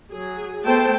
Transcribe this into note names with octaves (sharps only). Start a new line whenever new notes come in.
F#3 G#4
A3 B3 C5 G5 A5